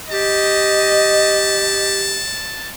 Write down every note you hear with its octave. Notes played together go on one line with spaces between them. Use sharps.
G4 D#5 A5